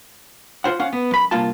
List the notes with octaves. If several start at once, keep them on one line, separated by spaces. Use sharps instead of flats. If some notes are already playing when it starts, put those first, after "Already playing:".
F4 C5 F#5
C#4 F5 F#5
B3
F#2 B5
C2 G2 A#3 F4 A5